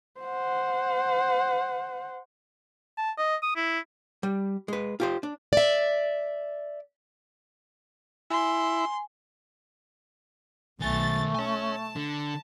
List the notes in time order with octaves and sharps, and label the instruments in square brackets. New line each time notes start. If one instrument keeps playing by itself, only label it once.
[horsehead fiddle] C5 F#5
[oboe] A5
D#5
D#6
E4
[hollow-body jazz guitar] G3
G#3 B4
F4 G4 C5
D4
[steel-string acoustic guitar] D5 E5
[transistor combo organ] E4 [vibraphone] G#5 [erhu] C6
[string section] B1 A6 [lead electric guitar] D#3 G#5 [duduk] A3
[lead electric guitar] C#5 G#5 [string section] A5
[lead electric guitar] D3